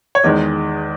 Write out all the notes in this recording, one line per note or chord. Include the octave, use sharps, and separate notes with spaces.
C#5
E2 D#3 G#3 D#5